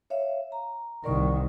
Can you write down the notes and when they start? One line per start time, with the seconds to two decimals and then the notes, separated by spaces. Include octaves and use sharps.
0.10 C#5 E5 F5
0.52 A#5
1.04 C2 D#3 A#4 D5 C#6